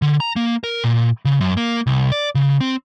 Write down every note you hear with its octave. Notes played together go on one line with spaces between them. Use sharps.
D3
A#5
A#3
A#4
A#2
C#3
F#2
A#3
C2
D5
C#3
C4